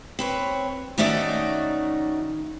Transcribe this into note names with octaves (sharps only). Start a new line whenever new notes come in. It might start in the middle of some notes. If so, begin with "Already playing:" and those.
C4 B4 C#5
D#3 A3 C#4 D#4 F#4 D5